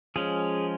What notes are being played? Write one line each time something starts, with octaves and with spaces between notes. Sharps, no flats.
F3 G#3 C#4 G#4